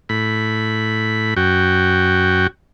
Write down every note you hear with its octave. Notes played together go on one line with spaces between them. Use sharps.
A2 B5
F#2 F#4 G5